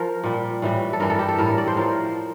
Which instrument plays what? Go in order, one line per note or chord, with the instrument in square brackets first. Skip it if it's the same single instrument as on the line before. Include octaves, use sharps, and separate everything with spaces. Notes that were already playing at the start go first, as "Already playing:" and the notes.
Already playing: [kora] F3 A#4
A#2 G3
A2 E3 G3
A4
G2 E3 G3 A#4
A4
G4
A4
A2 G3 A#4
D5
C5
A2 F3 A#4